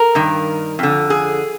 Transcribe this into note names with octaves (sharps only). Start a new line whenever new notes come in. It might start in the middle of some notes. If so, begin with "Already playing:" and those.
Already playing: A#4
G2 D#3
F2 D3
G#4